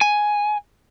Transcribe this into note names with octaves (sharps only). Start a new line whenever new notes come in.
G#5